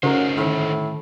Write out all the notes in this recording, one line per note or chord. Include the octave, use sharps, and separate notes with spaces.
C#3 A3 D#4 F#4 A#4 C5
A2 D3 D#3